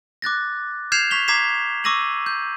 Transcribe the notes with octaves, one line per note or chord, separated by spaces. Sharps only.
D6 F#6 A6 A#6
F6 G6 G#6 C7 E7 F7
C#6 B6 F7 G7
A#5 D6 G#6 B6 C7 E7
C#6 D6 E6 A#6 D#7 F#7
G6